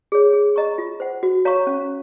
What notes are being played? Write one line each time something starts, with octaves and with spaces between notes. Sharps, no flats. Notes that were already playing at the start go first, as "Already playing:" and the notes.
G#4 C#5
G#4
D#5 A#5 C#6
F4
C5 F#5
F#4
C#5 F5 A#5 C#6
C#4